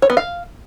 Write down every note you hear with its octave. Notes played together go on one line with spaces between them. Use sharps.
C#5
B3
F5